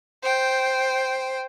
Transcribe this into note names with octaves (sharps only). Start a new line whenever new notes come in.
C5 G5